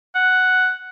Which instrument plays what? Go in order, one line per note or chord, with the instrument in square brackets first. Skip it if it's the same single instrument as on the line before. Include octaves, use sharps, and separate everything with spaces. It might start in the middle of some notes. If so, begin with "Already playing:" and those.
[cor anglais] F#5